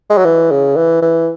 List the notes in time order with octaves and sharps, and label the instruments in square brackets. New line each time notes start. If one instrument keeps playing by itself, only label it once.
[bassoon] G#3
F#3
E3
C#3
E3
E3